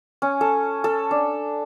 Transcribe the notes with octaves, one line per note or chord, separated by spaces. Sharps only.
C#4
A4
A4
D4